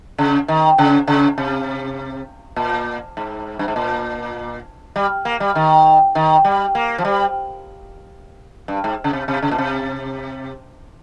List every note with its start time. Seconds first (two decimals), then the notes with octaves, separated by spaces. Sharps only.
0.18 C#3
0.48 D#3
0.78 C#3
1.07 C#3
1.38 C3
2.56 A#2
3.17 G#2
3.59 G2
3.68 G#2
3.76 A#2
4.96 G3
5.25 A#3
5.40 G3
5.55 D#3
6.15 D#3
6.45 G3
6.75 A#3
6.98 F3
7.05 G3
8.68 G2
8.84 G#2
9.04 C#3
9.13 C3
9.28 C3
9.42 C#3
9.51 A#2
9.58 C3